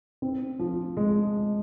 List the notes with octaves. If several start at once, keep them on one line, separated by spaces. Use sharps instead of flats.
C4
F3
G#3